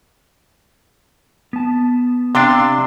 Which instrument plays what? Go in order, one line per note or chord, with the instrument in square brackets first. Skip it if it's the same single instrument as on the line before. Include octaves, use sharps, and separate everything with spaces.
[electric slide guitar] B3 A5
[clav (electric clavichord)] C3 D4 [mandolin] F5 C6 E6